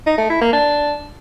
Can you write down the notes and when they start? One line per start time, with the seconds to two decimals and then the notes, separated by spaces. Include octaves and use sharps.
0.06 D#4
0.18 A3
0.30 E4
0.41 A#3
0.53 D4